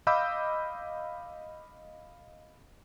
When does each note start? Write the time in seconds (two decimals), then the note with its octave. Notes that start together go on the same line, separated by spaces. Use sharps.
0.07 D#5 F5 B5 D6 E6 G6